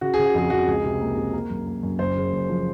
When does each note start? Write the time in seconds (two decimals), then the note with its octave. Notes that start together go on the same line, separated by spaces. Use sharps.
0.01 C#3 F#4
0.14 C#3 G#4
0.26 F#4
0.34 F2 G#4
0.50 F2 F#4
0.68 C#2 G#4
0.84 C3
1.01 A#3
1.17 C3
1.33 A#3
1.50 F#2
1.67 A#3
1.83 F#2
1.99 F#1 C5
2.16 C#3
2.32 F#1
2.49 F3